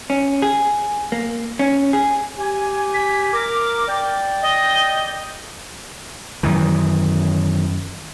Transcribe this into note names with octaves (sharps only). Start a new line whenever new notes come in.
C#4
G#4
A#3
C#4
G#4
G4 G#5
B6
A#4 D6
D5 G5
D#5
F#2 D#3 E3